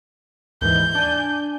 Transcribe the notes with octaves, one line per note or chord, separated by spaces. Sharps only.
D#2 G#2 E3 G6
D4 G#5